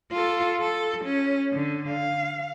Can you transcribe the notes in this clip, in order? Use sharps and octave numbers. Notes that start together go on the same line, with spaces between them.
F4 A4
A4
C#4
D3
F5